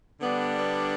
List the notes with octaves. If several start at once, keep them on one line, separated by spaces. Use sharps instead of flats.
D3 G3 B3 D4
B3